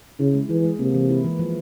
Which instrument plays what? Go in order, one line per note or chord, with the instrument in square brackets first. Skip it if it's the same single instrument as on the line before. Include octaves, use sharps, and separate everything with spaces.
[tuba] C#3 [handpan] E4
[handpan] G#3
[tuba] E3 [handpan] G#4
[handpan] G#3
[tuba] C3 [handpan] A#3
[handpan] E3
E4
E3
F3